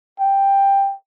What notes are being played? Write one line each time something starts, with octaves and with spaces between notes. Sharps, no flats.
G5